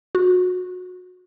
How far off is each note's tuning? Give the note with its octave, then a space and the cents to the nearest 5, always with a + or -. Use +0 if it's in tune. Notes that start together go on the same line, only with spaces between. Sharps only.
F#4 -25